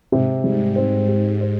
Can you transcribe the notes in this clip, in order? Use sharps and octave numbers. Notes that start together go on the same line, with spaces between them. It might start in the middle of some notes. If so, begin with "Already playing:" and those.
G#2 C3
G#2 G3
C4
G4
C5